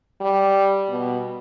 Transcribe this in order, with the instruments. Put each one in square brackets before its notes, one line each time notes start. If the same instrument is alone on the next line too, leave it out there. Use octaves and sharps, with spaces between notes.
[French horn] G3
B2